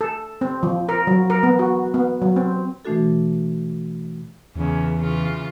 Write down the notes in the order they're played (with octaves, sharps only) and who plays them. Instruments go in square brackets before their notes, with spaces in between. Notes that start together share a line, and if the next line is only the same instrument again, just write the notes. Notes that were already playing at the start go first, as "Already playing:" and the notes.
[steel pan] A4
C4
F3
A#4
F#3
A#4
B3
F#4
B3
F#3
C4
[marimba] B2 E3 A3 D4 F#4 A4
[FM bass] E2 [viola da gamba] C#3 B3
[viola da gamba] C#3 E3 F4